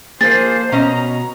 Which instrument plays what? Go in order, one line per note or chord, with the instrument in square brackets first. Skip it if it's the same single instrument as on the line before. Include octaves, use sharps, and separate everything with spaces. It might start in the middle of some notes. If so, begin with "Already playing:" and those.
[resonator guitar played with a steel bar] F3 G#4 [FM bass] A#3 [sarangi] C5 [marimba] A6
[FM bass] B2 [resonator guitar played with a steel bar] C#4 D#5 [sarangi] A#5